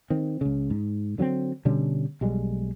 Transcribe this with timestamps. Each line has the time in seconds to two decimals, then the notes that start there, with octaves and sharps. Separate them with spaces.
0.10 D#3 C4
0.41 C#2 C#3
0.70 G#2
1.18 D3 F#3 A#3 C4
1.65 B2 D3 G3 C#4
2.21 B1 G3 G#3